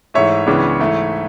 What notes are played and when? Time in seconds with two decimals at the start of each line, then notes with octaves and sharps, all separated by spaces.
0.14 G#2 E3 A3 C#5 E5
0.47 C#2 C#3 E3 B3 D4
0.80 G#2 E3 A3